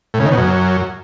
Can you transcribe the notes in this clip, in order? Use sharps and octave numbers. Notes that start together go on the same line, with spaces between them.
A2
C#3
D#3
B2
F#2